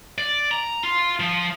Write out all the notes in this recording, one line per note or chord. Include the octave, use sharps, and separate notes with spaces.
D5
A#5
F4
F3